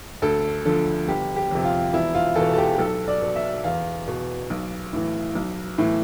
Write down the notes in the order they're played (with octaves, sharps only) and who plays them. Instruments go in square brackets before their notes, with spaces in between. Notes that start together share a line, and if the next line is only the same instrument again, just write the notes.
[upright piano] D2 A4
D3 F3 A4
G1 G4
G4
F2 C3
F4
E1 E4
F4
E2 B2 A4
A4
G4
G4
B1 A4
D5
B2
E5
E2 F5
B2
B1
A2 E3
B1
A2 E3